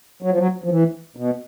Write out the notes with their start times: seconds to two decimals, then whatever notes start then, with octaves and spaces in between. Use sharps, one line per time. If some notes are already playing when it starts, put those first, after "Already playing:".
0.22 F#3
0.31 F3
0.38 F#3
0.64 F3
0.69 E3
1.17 B2